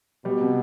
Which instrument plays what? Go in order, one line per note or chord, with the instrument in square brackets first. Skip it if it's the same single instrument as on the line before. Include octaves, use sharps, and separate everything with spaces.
[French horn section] B2 [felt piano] G3
[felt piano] C3